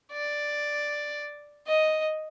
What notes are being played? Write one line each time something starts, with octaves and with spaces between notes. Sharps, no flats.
D5
D#5